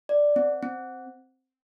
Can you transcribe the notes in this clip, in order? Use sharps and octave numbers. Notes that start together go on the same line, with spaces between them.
D5
C4
C4